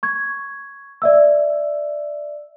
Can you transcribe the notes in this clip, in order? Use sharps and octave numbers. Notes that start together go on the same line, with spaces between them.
C#6 G#6
D5 E5 E6